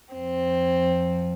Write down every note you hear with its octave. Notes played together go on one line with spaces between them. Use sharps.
F2 F3 C4